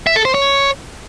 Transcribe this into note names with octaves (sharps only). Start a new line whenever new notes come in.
E5
A4
C5
C#5